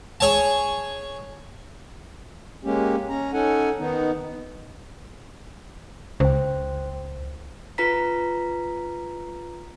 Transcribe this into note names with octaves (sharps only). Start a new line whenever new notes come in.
G#4 C#5 A5
G#3 A#3 C#4 G4
C#4 A#5
C#4 D#4 A4 F#5 G#5
D#3 B3 D#4
C#2 C5 G5
F4 B4 A#5 B6